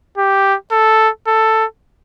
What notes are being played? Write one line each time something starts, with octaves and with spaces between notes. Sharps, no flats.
G4
A4
A4